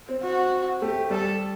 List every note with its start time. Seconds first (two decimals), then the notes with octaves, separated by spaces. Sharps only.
0.09 C4
0.23 F#4
0.81 A3 G4
1.10 G3 A4